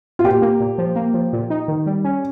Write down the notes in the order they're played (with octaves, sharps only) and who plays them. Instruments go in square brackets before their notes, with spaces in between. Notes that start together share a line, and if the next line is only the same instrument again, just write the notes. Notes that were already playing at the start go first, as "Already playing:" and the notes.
[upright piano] F4
[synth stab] A#2 [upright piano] G4
[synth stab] A#3
A#2
F3
A#3
F3
A#2
D#4
D#3
G3
C#4